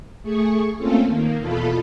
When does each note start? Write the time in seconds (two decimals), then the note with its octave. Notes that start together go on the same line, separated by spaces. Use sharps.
0.23 A3 G#4 C#6
0.77 A3 A#3 C4 C#4 F4 A4
1.08 D#3 A#3
1.38 E2 B2 F4 A4 B5